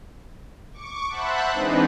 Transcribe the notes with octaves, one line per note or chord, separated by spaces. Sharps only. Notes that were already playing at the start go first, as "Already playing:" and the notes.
C#6 D6
C5 E5 F#5 A5 B5 F#6
E3 G#3 C4 D4 D#4 B4